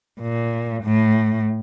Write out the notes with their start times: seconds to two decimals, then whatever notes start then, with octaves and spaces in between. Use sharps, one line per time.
0.21 A#2
0.84 A2